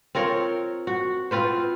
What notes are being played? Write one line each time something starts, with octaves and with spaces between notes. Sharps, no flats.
C4 F4 A#4 C#5
F#4
C4 F4 B4 C5